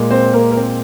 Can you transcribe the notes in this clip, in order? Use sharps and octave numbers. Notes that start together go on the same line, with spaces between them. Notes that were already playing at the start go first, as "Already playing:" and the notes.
Already playing: A#2 G#3
C4 C5
A#3 A#4
A#4
C4 C5